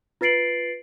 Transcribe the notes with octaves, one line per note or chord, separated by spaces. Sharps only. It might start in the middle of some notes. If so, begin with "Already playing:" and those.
F4 B4 A6 C7 D7 F#7